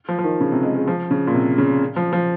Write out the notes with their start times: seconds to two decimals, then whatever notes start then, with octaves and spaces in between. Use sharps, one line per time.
0.09 F3
0.19 F3
0.24 D#3
0.40 C#3
0.52 C3
0.63 G#3
0.75 G#3
0.88 F3
1.11 C#3
1.27 A#2
1.34 C3
1.58 C#3
1.96 F3
2.13 F3